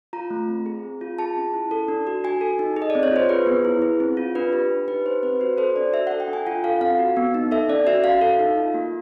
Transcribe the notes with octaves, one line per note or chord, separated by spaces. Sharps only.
F4 A#5
A3
C4
G#4
C4
F4
G#4 A5
C#4
E4
A4
D4
F#4
F#4 G#5
A4
D#4
G#4
D#5
D5
C4
C#5
F4 C5
G#4 B4
B3
E4
G#4
C4
F4
D4 B4
G4
G4
D#4 B4
G4 C5
C4 B4
F#4 C5
A4 C5
D4 D5
F#4 E5
F#5
A4
G5
D4
G#5
F4 F#5
A4 F5
C4 F5
F#4
B3
D#4
A4 E5
C#4 D5
F#4 E5
F#4 F5
A4
D#4
F4
A#3